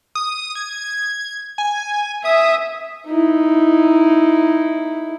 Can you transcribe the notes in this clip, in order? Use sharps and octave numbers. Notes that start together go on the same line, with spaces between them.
D#6
G#6
G#5
E5 D#6
D#4 E4